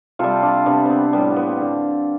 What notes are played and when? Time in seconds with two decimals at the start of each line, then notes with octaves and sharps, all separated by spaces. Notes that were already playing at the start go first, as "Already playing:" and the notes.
0.19 C3 G3 F4 A4
0.43 D4 F4
0.66 C3 G3 B3 D4
0.86 B3 C4
1.13 A2 G3 B3
1.30 C4
1.37 B3
1.49 C4
1.61 D3